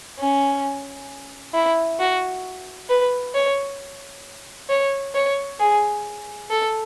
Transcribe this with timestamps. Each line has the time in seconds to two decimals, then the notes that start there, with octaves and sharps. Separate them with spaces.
0.19 C#4
1.54 E4
2.00 F#4
2.89 B4
3.35 C#5
4.70 C#5
5.15 C#5
5.60 G#4
6.50 A4